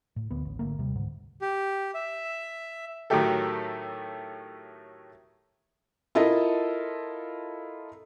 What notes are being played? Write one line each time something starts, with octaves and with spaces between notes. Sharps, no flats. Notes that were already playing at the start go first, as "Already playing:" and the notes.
A2
D2 B3
A1
G#1 D3 A3 A#3
D#2 C3 G3
C#2 G#2 D3
G4
E5
A2 D#3 F#3 A3 G4 A4
E4 F4 A4 A#4 D#5